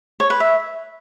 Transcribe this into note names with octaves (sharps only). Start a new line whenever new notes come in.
C#5
B4
E5